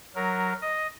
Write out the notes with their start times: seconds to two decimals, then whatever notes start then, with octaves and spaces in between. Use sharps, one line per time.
0.15 F#3 A#4
0.62 D#5